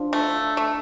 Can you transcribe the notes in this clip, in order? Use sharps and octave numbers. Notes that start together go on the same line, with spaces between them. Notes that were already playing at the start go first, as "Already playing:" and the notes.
Already playing: F3 D4
A3
A3